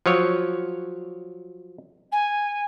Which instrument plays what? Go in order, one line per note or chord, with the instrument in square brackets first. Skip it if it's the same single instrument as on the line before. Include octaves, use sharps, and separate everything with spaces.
[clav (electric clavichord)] F3 F#3 C#5
[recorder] G#5